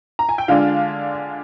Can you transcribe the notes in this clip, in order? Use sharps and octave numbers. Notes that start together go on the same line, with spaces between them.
A#5
G#5
G5
D3 G#3 D4 F4 F5